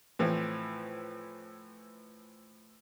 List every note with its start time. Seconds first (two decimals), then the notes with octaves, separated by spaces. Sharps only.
0.19 A2 E3 F3 C4